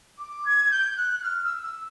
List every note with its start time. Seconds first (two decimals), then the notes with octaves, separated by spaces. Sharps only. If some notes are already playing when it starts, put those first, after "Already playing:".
0.18 D6
0.45 G#6
0.71 G6
0.97 F#6
1.19 F#6
1.23 F6
1.44 E6
1.63 E6